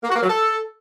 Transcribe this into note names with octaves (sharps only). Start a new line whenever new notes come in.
A#3
F#4
A#3
F#3
A4